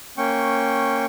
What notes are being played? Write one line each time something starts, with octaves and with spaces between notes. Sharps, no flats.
A#3 C#4 G5 C#6